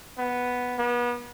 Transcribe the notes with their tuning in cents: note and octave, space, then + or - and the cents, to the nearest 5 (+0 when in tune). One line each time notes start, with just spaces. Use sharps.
B3 +0
B3 -30